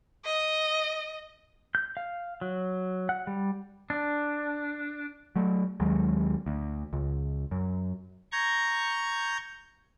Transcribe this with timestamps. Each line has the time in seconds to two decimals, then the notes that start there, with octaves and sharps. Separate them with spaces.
0.25 D#5
1.75 G6
1.97 F5
2.41 F#3
3.09 F#5
3.27 G3
3.90 D4
5.36 F#3 A3
5.80 D#2 F#3 G#3
6.46 D2
6.93 C#2
7.51 F#2
8.32 A#5 C#6 G6 G#6